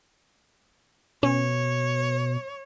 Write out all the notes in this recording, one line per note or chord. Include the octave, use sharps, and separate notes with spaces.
B2 C#4 C#5